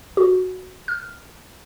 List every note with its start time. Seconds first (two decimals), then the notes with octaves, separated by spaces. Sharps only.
0.17 F#4
0.88 F6